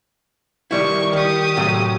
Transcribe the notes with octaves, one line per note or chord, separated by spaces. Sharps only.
D#3 G3 E4 C#6
D#3 G4 D#6
A2 C3 F#3